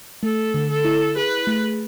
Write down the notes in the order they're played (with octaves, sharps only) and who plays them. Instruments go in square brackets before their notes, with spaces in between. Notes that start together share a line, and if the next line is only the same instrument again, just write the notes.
[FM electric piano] A3 [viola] A4
[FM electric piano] D3
[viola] A4
[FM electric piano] E4
[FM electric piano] G#4 [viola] B4
[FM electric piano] A3